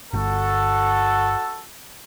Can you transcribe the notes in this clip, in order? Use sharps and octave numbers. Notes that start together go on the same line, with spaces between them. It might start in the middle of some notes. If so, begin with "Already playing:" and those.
G1 F#4 A4